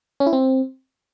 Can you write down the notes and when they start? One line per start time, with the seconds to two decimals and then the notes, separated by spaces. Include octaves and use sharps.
0.20 C#4
0.27 E4
0.33 C4